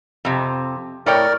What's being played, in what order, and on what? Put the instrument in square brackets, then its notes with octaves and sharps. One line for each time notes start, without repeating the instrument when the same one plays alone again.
[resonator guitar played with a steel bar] F2 C3
[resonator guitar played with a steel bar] A2 C#5 G5 [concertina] A#4 D5